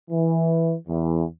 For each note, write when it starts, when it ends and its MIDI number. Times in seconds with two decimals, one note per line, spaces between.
0.10 0.73 52
0.87 1.23 40